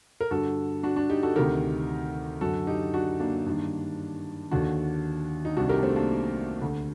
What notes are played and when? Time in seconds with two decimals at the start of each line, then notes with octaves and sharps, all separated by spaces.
0.21 A#4
0.31 G2 D3 F#4 A4
0.83 D4 F#4
0.96 D4 F#4
1.10 D#4 G4
1.23 F#4 A4
1.36 D2 C3 D#3 G4 A#4
2.41 F#2 D3 F#4 A4
2.67 D#4 G4
2.94 D4 F#4
3.20 A#3 D4
3.46 G2 D#3
4.51 D#2 D3 D4 F#4
5.45 D#4
5.57 C2 C3 D#3 D4 F#4
5.69 G4 A#4
5.78 D4
5.83 A3 C4
5.96 A#3 D4
6.62 D2 D3